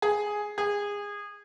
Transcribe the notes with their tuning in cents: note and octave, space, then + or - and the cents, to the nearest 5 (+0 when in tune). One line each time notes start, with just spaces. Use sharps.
G#4 +0
G#4 -25